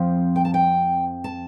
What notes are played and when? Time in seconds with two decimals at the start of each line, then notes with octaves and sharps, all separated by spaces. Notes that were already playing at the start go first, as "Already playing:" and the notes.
Already playing: F2 F3 C4
0.36 G5
0.45 A5
0.54 G5
1.24 A5